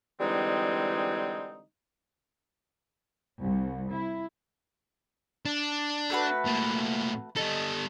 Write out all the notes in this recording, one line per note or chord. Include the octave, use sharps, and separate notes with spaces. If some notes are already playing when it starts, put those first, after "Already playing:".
D3 E3 G3 G#3 C4 D#4
C2
E4
D4
A3 F#4 B4
A2 A#3
G3 A4 D#5